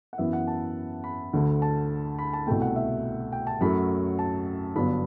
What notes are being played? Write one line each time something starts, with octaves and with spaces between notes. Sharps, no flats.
F#5
F#2 E3 B3 E5
F#5
A5
B5
D2 D3 A3
A5
B5
A5
C2 B2 A3 G5
F#5
E5
G5
A5
F#2 F#3 A3 B5
A5
G1 G2 F#3 B3 B5